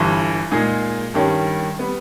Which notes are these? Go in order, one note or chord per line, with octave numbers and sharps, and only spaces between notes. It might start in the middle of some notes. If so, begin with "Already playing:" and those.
Already playing: G1 G2 E3
A#2 G#3 D#4 G#4
G2 D#3 G3 C#4
G3 B3